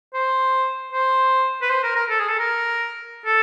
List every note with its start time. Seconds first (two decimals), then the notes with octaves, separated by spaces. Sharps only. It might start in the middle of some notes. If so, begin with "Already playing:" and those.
0.14 C5
0.93 C5
1.62 B4
1.70 C5
1.84 A#4
1.96 A#4
2.10 A4
2.19 G#4
2.28 A4
2.39 A#4
3.26 A4